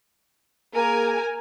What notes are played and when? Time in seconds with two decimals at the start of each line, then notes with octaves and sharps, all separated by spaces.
0.75 A#3 G#4 A#4 G#5